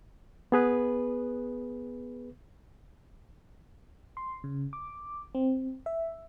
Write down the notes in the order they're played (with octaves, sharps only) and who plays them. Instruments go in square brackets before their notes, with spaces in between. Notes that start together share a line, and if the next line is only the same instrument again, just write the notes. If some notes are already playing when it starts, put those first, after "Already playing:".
[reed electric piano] B3 G#4 B4
[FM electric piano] C6
C#3
D6
C4
E5